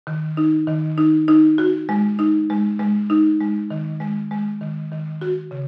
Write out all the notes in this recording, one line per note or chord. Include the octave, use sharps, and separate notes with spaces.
D#3
D#4
D#3
D#4
D#4
F#4
G#3
D#4
G#3
G#3
D#4
G#3
D#3
G#3
G#3
D#3
D#3
F#4
C#3